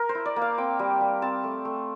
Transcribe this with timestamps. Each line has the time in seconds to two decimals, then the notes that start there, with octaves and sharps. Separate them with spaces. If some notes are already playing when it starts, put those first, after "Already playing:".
Already playing: A#4
0.09 C5
0.15 E4
0.26 D5
0.36 A#3
0.42 F5
0.58 C4 G5
0.79 G3
1.01 G3
1.22 C4 A5
1.44 A3
1.65 A3